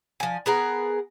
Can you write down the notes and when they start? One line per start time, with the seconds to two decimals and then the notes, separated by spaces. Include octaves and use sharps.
0.20 F3 G#5
0.46 B3 G#4 A#4